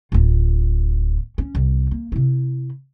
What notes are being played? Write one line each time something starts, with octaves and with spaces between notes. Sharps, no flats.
D1 F4
C#4
C2
A#3
C3 E4